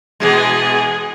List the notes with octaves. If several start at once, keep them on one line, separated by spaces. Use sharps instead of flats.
B2 E3 G#3 G#4